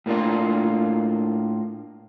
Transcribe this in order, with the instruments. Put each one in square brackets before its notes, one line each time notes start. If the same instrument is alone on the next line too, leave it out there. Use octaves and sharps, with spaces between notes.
[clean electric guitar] A2 A#3 D4 F4